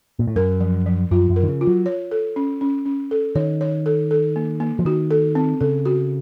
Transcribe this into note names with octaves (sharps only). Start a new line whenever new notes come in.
A#2
A2
F#2 A#4
F3
F3
F#2 F4
F#2
A#4
D#3
C#3
F4
F#3
C#5
A4
C#4
C#4
C#4
A4
D#3 C#5
C#5
A4
A4
A#3
A#3
F3
D#3 F#4
A4
C4
C#3 A4
F#4